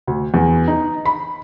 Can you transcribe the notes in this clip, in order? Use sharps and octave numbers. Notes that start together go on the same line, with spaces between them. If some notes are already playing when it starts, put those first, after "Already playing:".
D2
E2
D#4
B5